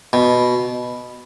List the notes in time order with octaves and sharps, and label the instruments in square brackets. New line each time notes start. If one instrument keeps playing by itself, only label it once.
[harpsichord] B2